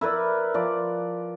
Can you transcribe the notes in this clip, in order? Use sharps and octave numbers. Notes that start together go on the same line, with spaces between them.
E4 A#4 B4 D5
F3 D5